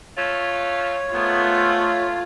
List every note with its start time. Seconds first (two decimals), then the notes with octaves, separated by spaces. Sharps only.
0.17 A3 F4 C#5
1.14 G#2 A3 B3 F4